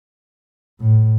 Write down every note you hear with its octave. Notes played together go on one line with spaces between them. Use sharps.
A2